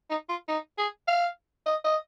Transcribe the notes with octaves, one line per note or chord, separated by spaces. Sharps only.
D#4
F4
D#4
G#4
F5
D#5
D#5